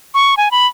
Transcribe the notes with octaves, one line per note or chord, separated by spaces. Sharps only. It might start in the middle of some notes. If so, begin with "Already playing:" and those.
C#6
G#5
B5